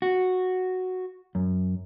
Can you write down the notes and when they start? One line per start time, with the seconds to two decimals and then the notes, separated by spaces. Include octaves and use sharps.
0.02 F#4
1.35 F#2